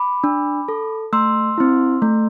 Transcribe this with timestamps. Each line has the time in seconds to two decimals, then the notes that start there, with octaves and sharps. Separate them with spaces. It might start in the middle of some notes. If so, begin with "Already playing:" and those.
Already playing: B5 D6
0.24 D4
0.68 A4
1.13 A3 C6 E6
1.58 C4 E4
2.02 A3